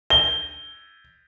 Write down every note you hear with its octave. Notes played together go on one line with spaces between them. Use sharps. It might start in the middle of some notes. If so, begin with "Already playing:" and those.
G7